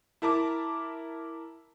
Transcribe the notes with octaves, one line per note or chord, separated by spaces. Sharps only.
E4 A#4 A5 A#5 D6